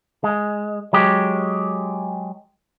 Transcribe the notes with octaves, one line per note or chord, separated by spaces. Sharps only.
G#3
F#3 G#3 G4